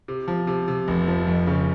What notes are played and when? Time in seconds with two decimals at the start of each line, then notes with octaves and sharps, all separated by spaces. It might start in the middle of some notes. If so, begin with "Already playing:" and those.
0.08 C3
0.28 F3
0.47 C3
0.68 C3
0.88 F1
1.08 F3
1.27 F2
1.47 C#3